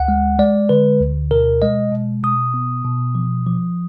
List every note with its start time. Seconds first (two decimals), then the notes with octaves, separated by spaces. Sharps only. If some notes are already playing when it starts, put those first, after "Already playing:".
Already playing: D2 F#5
0.08 G#3
0.39 G#3 D5
0.69 D3 B4
1.00 D2
1.31 B2 A#4
1.62 G#3 D#5
1.92 B2
2.23 B2 D#6
2.54 B3
2.85 B2
3.15 F3
3.47 F3